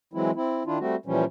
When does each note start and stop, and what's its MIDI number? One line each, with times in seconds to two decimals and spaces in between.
0.13 0.31 52
0.13 0.31 54
0.13 0.31 56
0.13 0.31 60
0.13 0.31 64
0.35 0.63 60
0.35 0.63 64
0.66 0.78 51
0.66 0.78 62
0.66 0.78 64
0.66 0.78 65
0.79 0.96 55
0.79 0.96 57
0.79 0.96 60
0.79 0.96 66
1.06 1.25 46
1.06 1.25 52
1.06 1.25 53
1.06 1.25 55
1.06 1.25 61